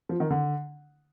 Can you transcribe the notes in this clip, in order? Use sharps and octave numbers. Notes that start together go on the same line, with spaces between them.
F3
D#3
D3